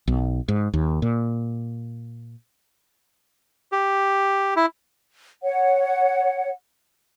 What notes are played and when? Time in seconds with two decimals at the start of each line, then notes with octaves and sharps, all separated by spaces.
0.07 B1
0.48 G#2
0.74 D#2
1.02 A#2
3.72 G4
4.56 E4
5.43 C#5 F#5